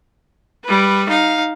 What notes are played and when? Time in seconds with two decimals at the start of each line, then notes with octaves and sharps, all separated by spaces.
0.65 G3 B4
1.10 D#4 F5